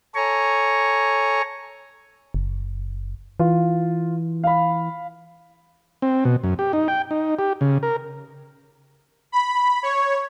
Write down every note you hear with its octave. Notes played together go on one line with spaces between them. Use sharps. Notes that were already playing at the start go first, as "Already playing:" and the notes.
A4 C#5 G#5 A#5 C#6
F#1
E3 F4
F5 B5
C4
B2
F#2
G4
D#4
G5
D#4
G4
C#3
A#4
B5
C#5